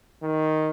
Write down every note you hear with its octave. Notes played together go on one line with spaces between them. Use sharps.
D#3